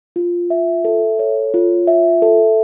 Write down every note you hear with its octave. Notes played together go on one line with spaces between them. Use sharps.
F4
E5
A4
C#5
F4
E5
A4